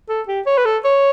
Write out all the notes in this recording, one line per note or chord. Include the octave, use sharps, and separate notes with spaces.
A4
G4
C#5
B4
A4
C#5